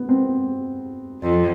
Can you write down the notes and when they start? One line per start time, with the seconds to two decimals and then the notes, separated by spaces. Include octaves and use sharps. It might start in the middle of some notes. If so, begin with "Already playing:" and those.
Already playing: B3
0.09 C4
1.22 F2